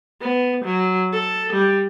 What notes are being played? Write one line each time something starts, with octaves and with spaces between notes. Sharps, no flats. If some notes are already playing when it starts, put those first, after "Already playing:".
B3
F#3
A4
G3